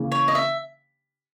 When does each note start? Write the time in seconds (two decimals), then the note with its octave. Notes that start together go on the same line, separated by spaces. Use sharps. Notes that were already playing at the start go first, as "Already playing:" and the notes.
Already playing: C#3 E3 A#3 C#4
0.12 C#5
0.28 D#5
0.35 E5